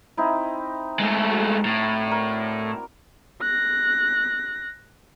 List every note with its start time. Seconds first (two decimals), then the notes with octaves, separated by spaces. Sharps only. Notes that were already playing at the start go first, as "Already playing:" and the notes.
0.17 C4 D#4 E4
0.99 G#3 A3
1.30 F#4
1.65 A2
2.07 A#4 D5
3.42 F#6 A#6